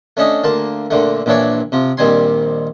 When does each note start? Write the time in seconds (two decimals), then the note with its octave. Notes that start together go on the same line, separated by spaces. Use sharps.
0.17 A3 C#4 D4 D#5
0.44 D2 A#3 A5 C6
0.91 A#2 D3 A3
1.26 A#1 A#2 E3 D4 C#5 D5
1.72 C3 F3
1.97 A#1 D#3 G3 C4 G#5 C6